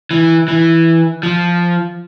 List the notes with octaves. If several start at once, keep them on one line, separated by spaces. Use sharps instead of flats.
E3
E3
F3